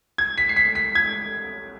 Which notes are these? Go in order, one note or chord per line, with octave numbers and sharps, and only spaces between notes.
G#6
B6
C7
B6
B6
G#6